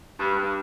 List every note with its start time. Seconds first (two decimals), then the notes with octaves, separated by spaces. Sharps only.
0.18 G2
0.36 G2